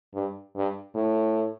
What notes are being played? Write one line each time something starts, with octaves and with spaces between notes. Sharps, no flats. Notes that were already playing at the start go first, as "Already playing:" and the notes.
G2
G2
A2